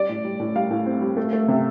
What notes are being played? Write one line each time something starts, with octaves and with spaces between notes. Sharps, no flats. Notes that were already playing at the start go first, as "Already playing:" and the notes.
Already playing: G3 D5
A2
G3
A2
G3 F5
A2
C4
G3
A3
A3
C3